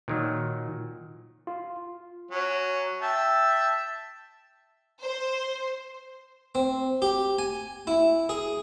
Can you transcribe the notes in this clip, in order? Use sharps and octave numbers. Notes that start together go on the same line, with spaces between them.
A#2 D#3 F#3
F4
F#3 C#4
E5 G5 A5
C5
C4
G4
G#5
E4
G#4